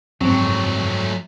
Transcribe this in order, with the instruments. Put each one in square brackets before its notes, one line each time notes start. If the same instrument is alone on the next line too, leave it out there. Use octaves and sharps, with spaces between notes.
[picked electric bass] F#1 F2 [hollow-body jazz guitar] G#2 [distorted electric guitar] F#3 A3 [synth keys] C4 G5